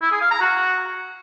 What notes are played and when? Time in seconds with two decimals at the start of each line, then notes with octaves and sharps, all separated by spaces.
0.02 E4
0.11 G#4
0.21 F5
0.31 A#5
0.41 F#4